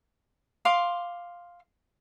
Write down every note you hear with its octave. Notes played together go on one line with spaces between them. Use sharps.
F5 C6 D6